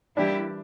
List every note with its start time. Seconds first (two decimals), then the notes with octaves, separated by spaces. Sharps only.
0.17 E3 G3 A#3 D4 E4 G4